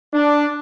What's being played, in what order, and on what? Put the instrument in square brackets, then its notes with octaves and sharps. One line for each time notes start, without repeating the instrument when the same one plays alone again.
[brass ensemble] D4